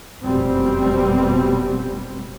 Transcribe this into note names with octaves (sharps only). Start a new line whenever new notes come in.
F1 F#2 B2 G3 C4